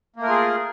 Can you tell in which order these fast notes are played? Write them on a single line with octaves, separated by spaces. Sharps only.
A#3 A3 A#4 F4 G#4